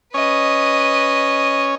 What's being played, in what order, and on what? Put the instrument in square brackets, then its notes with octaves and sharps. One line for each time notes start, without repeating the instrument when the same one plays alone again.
[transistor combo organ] C#4 C#5 [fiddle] B4 D#5